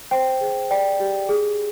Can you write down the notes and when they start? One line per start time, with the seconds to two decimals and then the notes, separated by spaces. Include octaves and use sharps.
0.11 C5 G5
0.41 G#4
0.71 D5 G5
1.00 G4
1.29 G#4